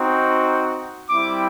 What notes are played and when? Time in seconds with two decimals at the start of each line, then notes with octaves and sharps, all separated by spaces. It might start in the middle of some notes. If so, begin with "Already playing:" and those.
Already playing: C4 D#4 F#4
1.09 G3 C4 E4 D6